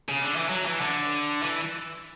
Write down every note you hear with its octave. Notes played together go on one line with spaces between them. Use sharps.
C#3
D3
E3
F#3
E3
D3
E3